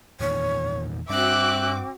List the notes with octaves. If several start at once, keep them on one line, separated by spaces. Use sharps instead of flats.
E2 A#2 D#3 C#5
G2 G3 C4 D4 F#4 E5 D6 F#6